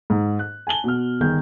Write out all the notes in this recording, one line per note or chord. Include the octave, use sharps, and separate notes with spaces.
G#2
F#6
G#5 A5 F#7 G7
B2 F6
G1 D#3 G#4 G6